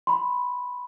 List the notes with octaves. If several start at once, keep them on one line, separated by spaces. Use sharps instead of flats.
B5 C6